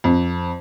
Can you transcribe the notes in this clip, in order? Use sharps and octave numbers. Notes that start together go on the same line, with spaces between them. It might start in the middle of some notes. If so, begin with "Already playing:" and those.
F2